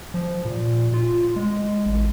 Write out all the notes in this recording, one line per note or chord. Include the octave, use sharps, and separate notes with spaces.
F3
A#2
F4
G#3
A1